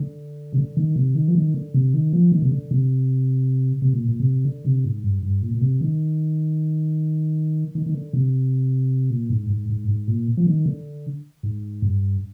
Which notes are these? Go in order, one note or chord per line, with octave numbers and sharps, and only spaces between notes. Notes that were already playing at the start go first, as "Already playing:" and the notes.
Already playing: D3
C3
D3
D#3
C3
D#3
F3
D#3
D3
C3
D#3
F3
D#3
C3
D3
C3
C3
A#2
A#2
C3
D3
C3
G#2
G2
G2
A#2
A#2
C3
D#3
D#3
D#3
D3
C3
A#2
G#2
G#2
G#2
G#2
A#2
F3
D#3
D3
G#2
G2